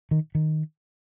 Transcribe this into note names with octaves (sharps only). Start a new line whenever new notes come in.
D#3
D#3